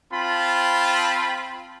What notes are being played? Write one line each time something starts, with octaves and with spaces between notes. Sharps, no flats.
C4 F4 A5 B5